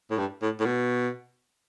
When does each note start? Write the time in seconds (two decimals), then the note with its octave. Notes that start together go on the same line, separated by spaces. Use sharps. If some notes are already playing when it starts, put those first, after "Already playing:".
0.10 A2
0.18 G2
0.42 A2
0.60 A2
0.66 B2